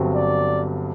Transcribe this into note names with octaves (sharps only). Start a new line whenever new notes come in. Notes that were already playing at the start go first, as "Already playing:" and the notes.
Already playing: G1 G2 F#3 C4
D5